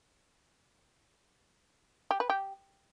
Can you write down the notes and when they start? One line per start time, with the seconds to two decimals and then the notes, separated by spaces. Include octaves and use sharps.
2.11 G4
2.20 B4
2.30 G4